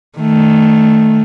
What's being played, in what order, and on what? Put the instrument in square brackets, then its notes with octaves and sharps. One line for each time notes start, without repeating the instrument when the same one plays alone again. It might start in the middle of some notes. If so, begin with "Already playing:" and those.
[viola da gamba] D#3 A3